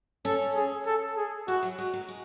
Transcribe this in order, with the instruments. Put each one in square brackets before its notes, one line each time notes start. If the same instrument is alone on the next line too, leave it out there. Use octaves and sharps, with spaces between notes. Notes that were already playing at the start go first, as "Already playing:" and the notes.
[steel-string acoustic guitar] C#4 [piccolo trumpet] A4
[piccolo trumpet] G#4
A4
G#4
[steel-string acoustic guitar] E4 [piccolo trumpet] F#4
[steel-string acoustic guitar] F#3
[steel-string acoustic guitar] G#3 [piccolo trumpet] F#4
[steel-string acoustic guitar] F#3
G#3